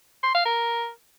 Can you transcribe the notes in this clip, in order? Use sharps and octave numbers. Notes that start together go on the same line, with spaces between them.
C6
F5
A#4